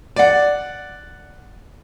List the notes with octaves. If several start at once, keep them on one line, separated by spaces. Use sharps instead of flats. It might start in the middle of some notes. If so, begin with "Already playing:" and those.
D5 F#5